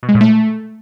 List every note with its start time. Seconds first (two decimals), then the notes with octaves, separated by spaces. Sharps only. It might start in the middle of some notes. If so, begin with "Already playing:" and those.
0.03 B2
0.09 G#3
0.15 A#2
0.21 A3